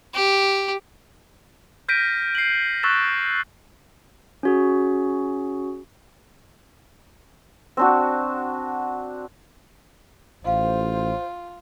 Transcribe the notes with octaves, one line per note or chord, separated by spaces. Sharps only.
G4
F6 G6 A#6 B6 D7 D#7
C7 F#7
C#6 E6 F#6 A6 E7
C#4 F#4 G#4
C4 D4 F#4
A1 F4 C5 D#5 F5